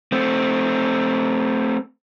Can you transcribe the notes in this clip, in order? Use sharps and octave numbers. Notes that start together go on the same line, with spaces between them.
A3 C4